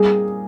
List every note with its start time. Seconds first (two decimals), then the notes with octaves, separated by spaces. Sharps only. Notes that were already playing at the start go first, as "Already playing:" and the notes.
Already playing: A#2 G3 C4 D#4 G#4 A#4